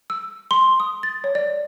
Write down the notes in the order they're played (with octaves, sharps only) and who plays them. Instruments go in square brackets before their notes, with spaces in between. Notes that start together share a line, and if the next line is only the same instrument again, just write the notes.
[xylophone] E6
C6
D#6
A6
C#5
D5